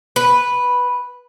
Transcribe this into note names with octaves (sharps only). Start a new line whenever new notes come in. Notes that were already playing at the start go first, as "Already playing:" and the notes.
B4